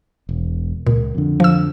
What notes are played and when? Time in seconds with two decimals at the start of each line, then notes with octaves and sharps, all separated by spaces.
0.29 E1
0.87 C#2 A#2
1.15 F2 D3
1.40 F3 E6